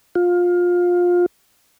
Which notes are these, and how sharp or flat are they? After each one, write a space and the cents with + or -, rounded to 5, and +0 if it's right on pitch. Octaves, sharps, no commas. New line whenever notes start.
F4 +20